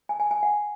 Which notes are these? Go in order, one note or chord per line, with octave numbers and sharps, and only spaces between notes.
G#5
G#5
G#5
F#5